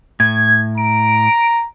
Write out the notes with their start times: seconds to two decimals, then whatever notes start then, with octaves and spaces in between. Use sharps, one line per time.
0.20 A2 G#6
0.78 A#5 D7